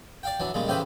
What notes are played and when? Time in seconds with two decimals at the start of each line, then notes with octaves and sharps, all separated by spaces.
0.23 D5 F5 G5
0.40 E3 F#3 D4
0.54 A#2 C#3 G3 G#3
0.67 A2 C#3 E3 G4 B4 C5